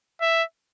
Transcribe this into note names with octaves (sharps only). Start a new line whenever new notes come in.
E5